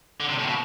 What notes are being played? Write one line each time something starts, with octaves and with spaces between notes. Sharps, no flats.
D3
C3
A2
B2